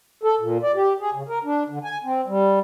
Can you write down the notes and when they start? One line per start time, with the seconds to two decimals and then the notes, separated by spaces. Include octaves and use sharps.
0.23 A4
0.40 A#2
0.63 D5
0.75 G4
1.01 G#4
1.13 C#3
1.28 A#4
1.44 D4
1.69 D3
1.84 G#5
2.04 C4
2.27 G3